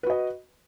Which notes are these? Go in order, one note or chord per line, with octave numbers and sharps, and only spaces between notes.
F#4 B4 D#5